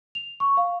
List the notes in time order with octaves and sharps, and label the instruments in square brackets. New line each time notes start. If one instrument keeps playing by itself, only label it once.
[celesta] F7
C#6
F5